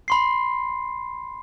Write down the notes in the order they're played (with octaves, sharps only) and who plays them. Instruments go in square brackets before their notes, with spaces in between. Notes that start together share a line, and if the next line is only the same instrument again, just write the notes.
[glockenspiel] B5 C6 C7